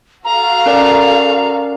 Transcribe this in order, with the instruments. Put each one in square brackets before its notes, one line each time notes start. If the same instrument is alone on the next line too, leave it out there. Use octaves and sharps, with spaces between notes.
[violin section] F#4 A4 F5 [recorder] A#5
[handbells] C#4 A#4 D5